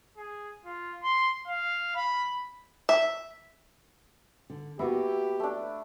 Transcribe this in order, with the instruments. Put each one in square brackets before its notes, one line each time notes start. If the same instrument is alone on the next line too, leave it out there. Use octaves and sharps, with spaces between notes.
[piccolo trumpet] G#4
F4
C6
F5
B5
[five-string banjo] E5
[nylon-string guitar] D3
[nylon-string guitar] A#3 B3 F#4 [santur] E4 [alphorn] G4
[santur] A3 D4